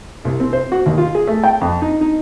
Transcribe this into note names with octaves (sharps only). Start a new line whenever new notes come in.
C2
C4
C5
F#4
D#2
F4
G#4
A3
G5
F2
D#4
D#4